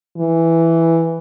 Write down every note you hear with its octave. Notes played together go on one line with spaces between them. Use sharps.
E3